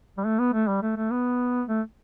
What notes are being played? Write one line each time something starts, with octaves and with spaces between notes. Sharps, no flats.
G3
A3
B3
A3
G3
A3
A3
B3
A3